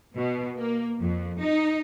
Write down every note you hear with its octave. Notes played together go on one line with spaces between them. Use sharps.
B2
A#3
F2
D#4